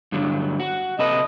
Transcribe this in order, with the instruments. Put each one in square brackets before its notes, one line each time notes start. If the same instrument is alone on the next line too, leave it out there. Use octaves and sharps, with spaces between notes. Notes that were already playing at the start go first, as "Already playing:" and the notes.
[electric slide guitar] G2 D3 F#3
F#4
[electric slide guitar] C3 A4 B4 [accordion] D#5